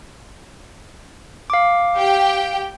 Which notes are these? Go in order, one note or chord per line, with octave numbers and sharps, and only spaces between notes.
F5 D6
G4 G5